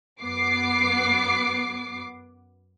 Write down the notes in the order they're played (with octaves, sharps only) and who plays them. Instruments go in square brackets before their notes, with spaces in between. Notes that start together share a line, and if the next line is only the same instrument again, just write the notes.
[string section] F#2 B3 D6 C7